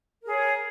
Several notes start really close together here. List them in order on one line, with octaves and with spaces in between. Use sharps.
A#4 G#4 C#5